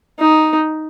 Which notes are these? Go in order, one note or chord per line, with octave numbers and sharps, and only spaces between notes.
D#4